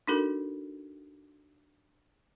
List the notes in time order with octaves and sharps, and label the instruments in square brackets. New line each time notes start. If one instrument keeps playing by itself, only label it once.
[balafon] D4 D#4 F#4 A4 A#4